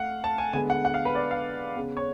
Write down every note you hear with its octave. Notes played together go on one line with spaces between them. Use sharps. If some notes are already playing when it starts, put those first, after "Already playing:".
Already playing: A3 F5 F#5
A5
G#5
D3 G#3 B3 G#5
F#5
F#5
F5
B4
D5
F5
C#3 G#3 B3
C#5